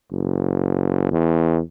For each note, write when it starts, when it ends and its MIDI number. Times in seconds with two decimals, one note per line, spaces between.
0.12 1.12 30
1.12 1.61 40